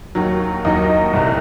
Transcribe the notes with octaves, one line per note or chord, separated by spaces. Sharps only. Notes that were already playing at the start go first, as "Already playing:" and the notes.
D#2 D#3 F#3
D#2 D#3 F#3 D#5
C2 C3 E3